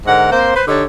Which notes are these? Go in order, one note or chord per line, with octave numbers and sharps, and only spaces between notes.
G#2 D3 A#4 F#5
A#3 C4 C5
B4 C5
D3 D4 D#4 G4 C#5